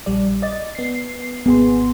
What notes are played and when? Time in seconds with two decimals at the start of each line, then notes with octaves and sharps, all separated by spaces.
0.06 A#1 G3 D5
0.42 D5 D#5 A6
0.75 B3 C7
1.46 G#1 B3 G#4 C6